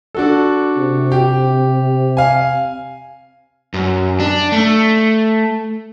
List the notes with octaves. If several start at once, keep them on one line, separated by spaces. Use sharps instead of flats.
D4 F#4 A4
C3
G4
F5 G#5
F#2
D4
A3